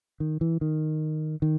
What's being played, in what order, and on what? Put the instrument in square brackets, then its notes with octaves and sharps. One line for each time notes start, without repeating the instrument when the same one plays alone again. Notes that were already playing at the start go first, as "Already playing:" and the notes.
[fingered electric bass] D#3
E3
D#3
D#3